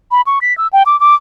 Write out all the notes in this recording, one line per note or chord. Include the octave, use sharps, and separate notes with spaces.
B5
C#6
B6
E6
G5
D6
D6